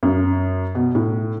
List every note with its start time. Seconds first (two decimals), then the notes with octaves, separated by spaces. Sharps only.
0.03 F#2
0.75 B2
0.95 A2